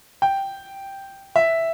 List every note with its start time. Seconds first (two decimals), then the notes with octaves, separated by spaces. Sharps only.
0.22 G5
1.36 E5